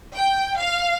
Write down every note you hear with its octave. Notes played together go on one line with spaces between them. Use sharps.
G5
F5